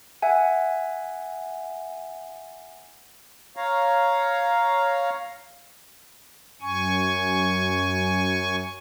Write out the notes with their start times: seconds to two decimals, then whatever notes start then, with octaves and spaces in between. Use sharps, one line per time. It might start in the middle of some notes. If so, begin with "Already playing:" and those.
0.22 E5 F#5 G#5
3.57 C#5 F5 A#5
6.61 F#2 G#5 C#6